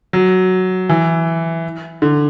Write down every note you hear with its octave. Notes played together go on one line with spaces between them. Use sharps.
F#3
E3
D3